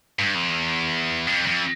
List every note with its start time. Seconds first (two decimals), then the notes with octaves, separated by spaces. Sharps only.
0.19 G2
0.35 F2
0.50 E2
1.27 F2
1.47 F2